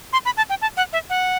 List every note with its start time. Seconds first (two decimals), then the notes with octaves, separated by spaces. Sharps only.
0.13 C6
0.25 B5
0.37 A5
0.50 G5
0.62 A5
0.77 F#5
0.93 E5
1.10 F#5